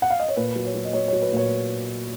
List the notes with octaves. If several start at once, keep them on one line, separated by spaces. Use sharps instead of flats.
F#5
F5
D#5
C#5
A#2 B4
F#3
C#5
F#3
D#5
F#3 C#5
C#5
F#3
B4
A#2 C#5